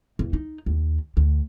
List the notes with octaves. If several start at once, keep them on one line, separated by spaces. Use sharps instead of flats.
E2
D#4
D#2
D2